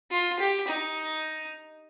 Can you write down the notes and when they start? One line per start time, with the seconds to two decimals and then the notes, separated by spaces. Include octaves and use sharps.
0.11 F4
0.40 G4
0.68 D#4